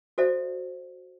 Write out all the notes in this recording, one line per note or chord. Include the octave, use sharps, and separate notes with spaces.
F#4 A4 C5 D5 E5